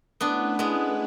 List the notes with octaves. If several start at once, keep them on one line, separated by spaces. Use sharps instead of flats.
A3 B3 C#4 D4 E4 B4
G#3 B3